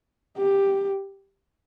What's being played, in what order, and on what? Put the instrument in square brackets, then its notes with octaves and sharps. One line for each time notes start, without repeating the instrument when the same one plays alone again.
[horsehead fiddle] G4